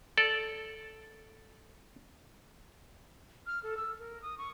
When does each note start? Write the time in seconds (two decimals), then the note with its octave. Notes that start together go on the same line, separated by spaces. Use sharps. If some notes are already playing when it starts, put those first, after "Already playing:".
0.17 A4 D5
3.47 F6
3.63 A4
3.77 E6
4.00 A#4
4.22 D#6
4.38 C#6